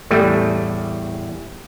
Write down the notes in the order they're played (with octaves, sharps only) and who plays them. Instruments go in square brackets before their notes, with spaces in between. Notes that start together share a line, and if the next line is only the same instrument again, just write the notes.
[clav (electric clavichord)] E2 A2 G3 A3